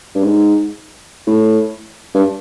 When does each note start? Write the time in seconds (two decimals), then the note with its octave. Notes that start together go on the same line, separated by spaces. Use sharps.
0.15 G2
0.23 G#2
1.27 A2
2.14 G2